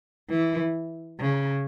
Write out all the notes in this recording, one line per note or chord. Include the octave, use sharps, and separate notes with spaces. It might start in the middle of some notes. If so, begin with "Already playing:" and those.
E3
C#3